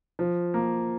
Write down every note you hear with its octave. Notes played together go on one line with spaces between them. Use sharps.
F3
A#3